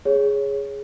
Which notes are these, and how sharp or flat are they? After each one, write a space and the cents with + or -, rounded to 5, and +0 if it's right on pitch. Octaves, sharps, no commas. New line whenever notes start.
G#4 +0 C#5 +0